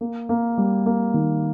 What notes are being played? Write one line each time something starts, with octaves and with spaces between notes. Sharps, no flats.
A#3
A#3
G3
A#3
D#3